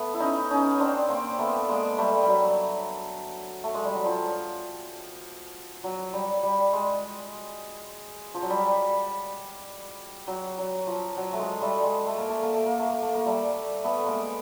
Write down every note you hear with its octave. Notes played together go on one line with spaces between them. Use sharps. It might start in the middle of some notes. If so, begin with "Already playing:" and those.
Already playing: A3 B3
E4
C#4 D#4
C#4 D#4
C4 D4
A#3 C4
A3 B3
G#3 A#3
G3 A3
G3
F#3
A3
G#3
G3
F#3
F3
F#3
G3
G3
G#3
F3
F#3
G3
F#3
F#3
F3
F#3
A3
G#3
G3 A3
G#3
A3
A#3
A3
A#3
A3
A#3
A3
A#3
A3
A#3
G3 A3
A3 B3
G#3 A#3